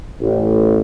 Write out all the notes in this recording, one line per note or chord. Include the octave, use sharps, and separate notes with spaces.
A1